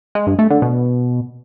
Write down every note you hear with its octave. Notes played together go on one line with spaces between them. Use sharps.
G#3
G2
A3
D3
B2